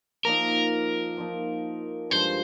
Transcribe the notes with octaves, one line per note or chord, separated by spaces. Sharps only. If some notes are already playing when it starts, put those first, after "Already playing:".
F3 A#3 D#4 A#4
F3 A#3 D#4
G2 F3 G#3 C5